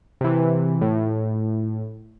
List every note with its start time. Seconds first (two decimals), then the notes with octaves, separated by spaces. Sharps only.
0.21 C3 E3
0.81 A2